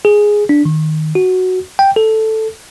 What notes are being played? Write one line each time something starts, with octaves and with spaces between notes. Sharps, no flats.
G#4
D4
D#3
F#4
G5
A4